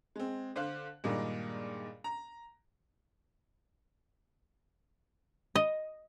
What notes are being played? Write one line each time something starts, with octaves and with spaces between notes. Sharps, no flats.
G#3 C4
D3 C5 F5 F#6
G2 A#2 D#3 G#3 A#3 D4
A#5
D#5